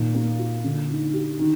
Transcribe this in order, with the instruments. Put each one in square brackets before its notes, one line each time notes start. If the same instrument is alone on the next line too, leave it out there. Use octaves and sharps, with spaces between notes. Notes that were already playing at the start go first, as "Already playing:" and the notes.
Already playing: [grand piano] A#2 D#3
A#3
F4
D3
D#4
G4
D#3